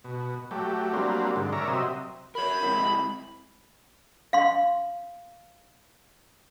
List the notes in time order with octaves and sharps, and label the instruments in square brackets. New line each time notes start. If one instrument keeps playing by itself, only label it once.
[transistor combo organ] B2
F#3 A3 G4
F#3 G3 A#3 C4 D4
G#2 D3
A#4 C#5 D5 E5 A#5
C3 F#3 C4 D#5 E5
[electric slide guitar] A#4 C#5 [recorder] B5
[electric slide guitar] G#3 C4 E4
[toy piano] F5 C6